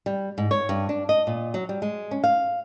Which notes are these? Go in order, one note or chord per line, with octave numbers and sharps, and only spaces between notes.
G3
G#2
C#5
G2
D4
D#5
A#2
F#3
G3
G#3
C#4
F5